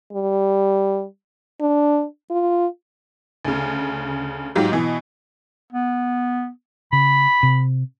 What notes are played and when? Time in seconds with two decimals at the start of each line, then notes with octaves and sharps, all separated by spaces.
0.12 G3
1.60 D4
2.30 F4
3.45 D2 C#3
4.55 G#2 F#3 F4 G4
4.72 B2 E3
5.73 B3
6.93 C#3 B5
7.43 C3